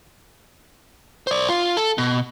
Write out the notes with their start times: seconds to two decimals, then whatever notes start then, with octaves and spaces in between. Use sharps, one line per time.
1.27 C5 D5
1.49 F4
1.77 A4
1.98 B2